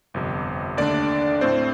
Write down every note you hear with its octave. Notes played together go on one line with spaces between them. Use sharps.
G1 F2 C3
D#2 D3 A3 D4 D5
A2 A3 C4 C5